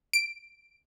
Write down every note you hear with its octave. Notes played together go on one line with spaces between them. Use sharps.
D7